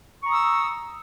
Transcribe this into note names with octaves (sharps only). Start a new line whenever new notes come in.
A#5 C#6 D#6 E6